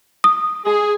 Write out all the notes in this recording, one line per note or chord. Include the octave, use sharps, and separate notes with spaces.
D#6
G#4